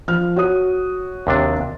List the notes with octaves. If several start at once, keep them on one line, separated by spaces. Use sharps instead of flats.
F3 F6
F#4 C#5 D#6
D#2 C3 D4